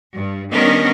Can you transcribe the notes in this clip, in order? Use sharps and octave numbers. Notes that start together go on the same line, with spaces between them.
G2
D#3 G3 B3 C#4 D4 A#4